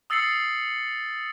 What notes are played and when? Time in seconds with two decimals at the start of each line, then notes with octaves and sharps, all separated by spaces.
0.10 D#6 E6 A6 C7 C#7 F#7